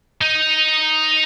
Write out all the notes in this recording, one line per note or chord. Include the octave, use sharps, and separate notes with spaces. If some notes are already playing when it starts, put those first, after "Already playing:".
D#4